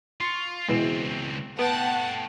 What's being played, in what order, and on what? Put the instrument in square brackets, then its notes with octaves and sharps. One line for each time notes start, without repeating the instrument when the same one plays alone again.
[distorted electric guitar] F4 [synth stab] C6 C#6
[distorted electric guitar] C#2 C4 [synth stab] B2 E3 G#3
[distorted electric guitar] A3 G5 [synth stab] B3 [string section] F#5 A5